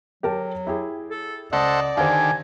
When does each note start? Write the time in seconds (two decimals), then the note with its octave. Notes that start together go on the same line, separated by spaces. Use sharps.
0.23 F#3 G4 A#4 A5
0.67 E4 G4 G#4
1.11 A4
1.53 C#2 A4 C5 D5 D#5 F#5
1.97 D3 D#3 G4 C5 F5 G#5